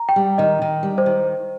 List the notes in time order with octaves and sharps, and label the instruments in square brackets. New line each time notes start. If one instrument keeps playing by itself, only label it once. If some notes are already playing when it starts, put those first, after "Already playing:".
Already playing: [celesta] A#5
G5
[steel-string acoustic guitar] G3
[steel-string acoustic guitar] D#3 [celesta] D#5
[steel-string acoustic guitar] D#3
G3
[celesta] C5
[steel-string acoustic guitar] D#3